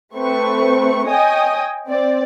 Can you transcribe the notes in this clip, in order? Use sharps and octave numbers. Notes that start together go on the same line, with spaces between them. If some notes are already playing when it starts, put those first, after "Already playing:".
A3 C4 B4 C#6
C#5 D#5 G5 G#5 D#6
C4 D5